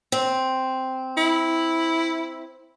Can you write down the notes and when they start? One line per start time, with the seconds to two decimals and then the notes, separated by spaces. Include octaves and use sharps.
0.12 C4
1.17 E4